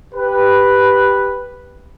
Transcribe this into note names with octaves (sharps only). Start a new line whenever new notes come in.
G4 B4